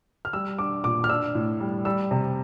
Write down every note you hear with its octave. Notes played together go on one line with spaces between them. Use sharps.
F6
G3 E6
D4 D6
A#2 D6
F6
D4 E6
A2
G3
G3 E6
C3